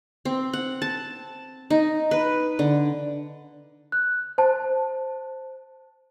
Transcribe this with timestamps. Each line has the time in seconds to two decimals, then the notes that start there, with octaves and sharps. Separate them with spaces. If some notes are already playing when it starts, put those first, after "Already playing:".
0.25 C4
0.53 F#5
0.82 A5
1.70 D#4
2.11 B4
2.59 D3
3.92 F#6
4.38 C5 A5